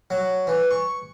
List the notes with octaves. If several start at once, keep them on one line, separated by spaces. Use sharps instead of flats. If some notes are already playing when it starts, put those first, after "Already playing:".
F#3
E3
C#6